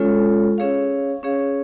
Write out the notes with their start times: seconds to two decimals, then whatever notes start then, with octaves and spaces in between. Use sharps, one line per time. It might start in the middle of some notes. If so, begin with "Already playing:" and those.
Already playing: G#3 C#4 F4 A4 C#5
0.58 C#4 G#4 C#5 F5
1.23 C#4 G#4 C#5 F5